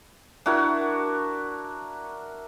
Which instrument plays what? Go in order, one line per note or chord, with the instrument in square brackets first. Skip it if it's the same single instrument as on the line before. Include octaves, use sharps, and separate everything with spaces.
[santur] D4 E4 F#4 A#4